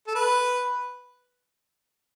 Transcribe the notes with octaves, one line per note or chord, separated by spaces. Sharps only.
A4
B4